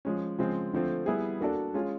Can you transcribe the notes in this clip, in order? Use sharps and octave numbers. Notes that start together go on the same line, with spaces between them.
F3 G#3 C#4
C#3 F3 G#3 C4
D3 F3 A3 C4
G3 B3 E4 G#4
A#3 D4 F#4 A4 D5
G#3 C#4 F4 G#4